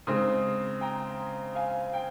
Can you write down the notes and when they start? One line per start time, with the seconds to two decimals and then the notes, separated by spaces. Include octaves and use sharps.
0.07 C#3 G#3 C4 D#4 C6 D#6
0.81 G5 A#5
1.55 F5 G#5
1.93 G5